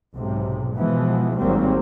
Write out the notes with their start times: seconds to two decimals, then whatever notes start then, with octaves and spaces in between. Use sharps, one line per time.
0.14 B1 G#2 C3
0.76 B2 E3 F3 G#3 B3
1.37 G#1 G#2 F#3 G3 A#3 C4